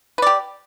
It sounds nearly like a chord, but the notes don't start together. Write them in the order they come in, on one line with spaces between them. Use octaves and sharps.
B4 D5 G4